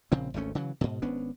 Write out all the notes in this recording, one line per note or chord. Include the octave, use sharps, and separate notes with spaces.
A#1 A#2 C#3 C4
G#1 D2 A3 C#4
C#3 E3 F#3
G#2 B2
G#1 B3 C#4 D4